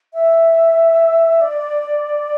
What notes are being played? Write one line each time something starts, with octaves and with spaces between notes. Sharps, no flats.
E5
D5